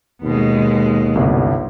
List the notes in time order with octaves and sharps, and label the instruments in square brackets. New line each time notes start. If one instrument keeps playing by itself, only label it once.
[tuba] D#2 [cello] B2 G#3
[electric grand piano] G1 C2